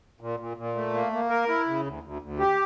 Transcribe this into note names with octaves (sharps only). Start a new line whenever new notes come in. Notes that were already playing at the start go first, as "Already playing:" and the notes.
A#2
A#2
A#2
A3
A#3
A#3
A#4
E4
C#3
D2
D2
D2
G4